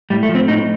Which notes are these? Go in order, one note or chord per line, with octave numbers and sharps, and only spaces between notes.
A2 G3
A3
F3
C4
A2 D#4